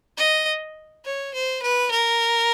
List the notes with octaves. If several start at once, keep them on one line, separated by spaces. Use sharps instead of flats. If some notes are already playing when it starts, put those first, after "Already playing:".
D#5
C#5
C5
B4
A#4